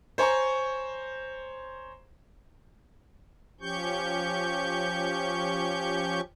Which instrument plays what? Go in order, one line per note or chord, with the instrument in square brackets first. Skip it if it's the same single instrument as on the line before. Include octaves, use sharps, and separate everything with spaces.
[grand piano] C5 C#5 G#5 A#5 C#6
[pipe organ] F3 C#4 G4 C#6 G6